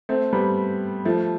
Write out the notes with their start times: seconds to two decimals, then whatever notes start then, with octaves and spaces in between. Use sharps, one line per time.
0.09 A3 C4
0.33 G3 B3
1.05 F3 A3